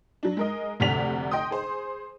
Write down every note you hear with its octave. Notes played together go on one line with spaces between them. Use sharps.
F#3 D4
G#3 A#4 D#5
F1 D2 C3 D5 B6 F7
D#5 G5 C6 D#6
G#4 C5